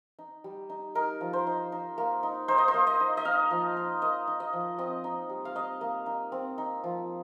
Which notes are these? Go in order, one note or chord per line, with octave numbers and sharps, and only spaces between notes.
D#4
G3
D#4
D#4 A#4
F3
C5
D#4
D#4
A#3
D#4
D#4 C5
D#5
C5
A#3
D#5
D#4
D#5
D#4 F5
F3
D#4
A#3 D#5
D#4
D#5
F3
C4 D#5
D#4
G3
F5
D#4 D#5
A#3
D#4
C4
D#4
F3